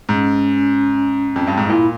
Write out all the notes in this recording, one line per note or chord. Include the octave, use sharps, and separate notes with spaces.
G#2 C#4
F2
G2
G#2
A#2 E4